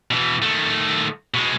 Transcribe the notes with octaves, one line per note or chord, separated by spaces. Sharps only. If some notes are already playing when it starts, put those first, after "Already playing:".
B2 E3
D#3 A3
B2 G#3